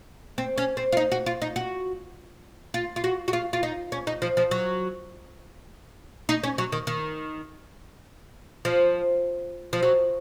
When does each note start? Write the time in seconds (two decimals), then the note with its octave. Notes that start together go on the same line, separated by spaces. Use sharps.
0.38 C4
0.58 C#4
0.77 C4
0.92 F4
0.97 D#4
1.12 F#4
1.26 F4
1.42 D#4
1.56 F#4
2.74 F4
2.96 F4
3.04 F#4
3.28 F#4
3.33 F4
3.53 F4
3.63 D#4
3.92 C#4
4.07 D#4
4.22 F3
4.37 F3
4.51 F#3
6.29 D#4
6.43 C#4
6.58 F#3
6.72 D#3
6.87 D#3
8.65 F3
9.73 F3
9.83 F#3